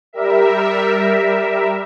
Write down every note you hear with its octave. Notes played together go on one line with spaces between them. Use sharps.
G3 A#4 E5